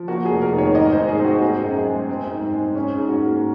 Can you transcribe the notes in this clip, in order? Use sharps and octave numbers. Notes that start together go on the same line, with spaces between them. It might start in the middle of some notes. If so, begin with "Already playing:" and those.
Already playing: F3
A#3 F#4
F1 G#4
A#4
D#3
C#5
G#2 D#5
G#2 C5
G#4
C4
F#4
C4 G#4
F#2
G#3
C4
G#2
G#3
C#4
G#4
G#2
F#4
A#3
A#4